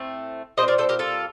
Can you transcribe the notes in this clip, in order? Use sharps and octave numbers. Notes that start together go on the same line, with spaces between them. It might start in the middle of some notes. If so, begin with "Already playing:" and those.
Already playing: A2 A3 C4
A#2 G3 C4 C5 D#5
A#4 D5
A4 C5
G4 A#4
F4 A4